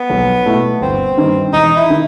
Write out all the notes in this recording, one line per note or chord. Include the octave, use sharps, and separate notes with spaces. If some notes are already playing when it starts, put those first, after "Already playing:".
Already playing: B3
B1
B2 A3 E4
G1 C4
G2 D#3
E1 D#4
E4
D#3